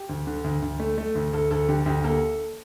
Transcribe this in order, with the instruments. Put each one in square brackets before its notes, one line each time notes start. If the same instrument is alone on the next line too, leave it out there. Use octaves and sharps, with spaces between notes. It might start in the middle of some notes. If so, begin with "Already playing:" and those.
Already playing: [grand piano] G4
D2
D3
D2
D2
A3
A3
D2
D2 A4
D2 A4
D3 G4
D2 G4
A#3 A4